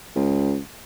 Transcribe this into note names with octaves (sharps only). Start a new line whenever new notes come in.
C#2